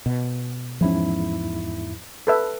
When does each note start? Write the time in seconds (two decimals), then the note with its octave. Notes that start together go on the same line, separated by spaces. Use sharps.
0.06 B2
0.81 E2 G#2 F3 C#4 E4
2.27 A4 B4 E5